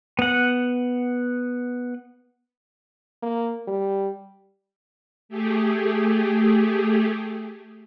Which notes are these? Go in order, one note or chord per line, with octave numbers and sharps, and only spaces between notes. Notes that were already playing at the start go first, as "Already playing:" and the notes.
B3 F#5
A#3
G3
A3 G4 G#4